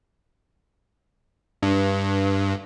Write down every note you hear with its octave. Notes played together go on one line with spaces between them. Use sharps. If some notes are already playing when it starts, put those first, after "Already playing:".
G2